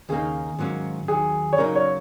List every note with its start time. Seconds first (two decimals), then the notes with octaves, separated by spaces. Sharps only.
0.09 D#2 C#3 A#3 D#4 G#4
0.58 G#2 D#3 F#3 A#3 C#4
1.08 D#2 D#3 F#3 G#4
1.53 C#5
1.58 C#3 F#3 A#3 D#4 A#4
1.76 C#5